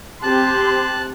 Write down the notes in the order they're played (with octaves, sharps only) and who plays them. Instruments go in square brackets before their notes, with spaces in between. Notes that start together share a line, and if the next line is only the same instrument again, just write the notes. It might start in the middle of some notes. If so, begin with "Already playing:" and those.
[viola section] C4 G4 C6 [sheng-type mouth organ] A5 F#6